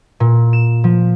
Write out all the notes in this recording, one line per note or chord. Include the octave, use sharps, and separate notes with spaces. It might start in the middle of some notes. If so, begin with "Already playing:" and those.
A#2
E7
F3